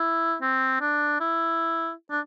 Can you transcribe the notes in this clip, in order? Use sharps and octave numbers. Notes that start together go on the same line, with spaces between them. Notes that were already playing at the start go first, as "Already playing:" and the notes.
Already playing: E4
C4
D4
E4
D4